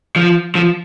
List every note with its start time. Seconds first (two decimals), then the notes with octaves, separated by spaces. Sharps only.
0.16 F3
0.55 F3